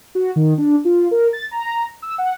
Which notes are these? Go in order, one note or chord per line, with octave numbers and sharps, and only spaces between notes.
F#4
D#3
D4
F4
A#4
A6
A#5
E6
F#5